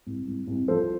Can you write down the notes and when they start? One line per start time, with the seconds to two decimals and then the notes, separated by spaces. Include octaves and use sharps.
0.07 C2
0.28 C2
0.48 C2
0.68 F3 A4 C5